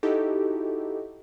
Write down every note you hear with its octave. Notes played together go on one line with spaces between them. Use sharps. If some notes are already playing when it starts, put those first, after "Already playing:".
D#4 E4 F#4 G4 A4 D#5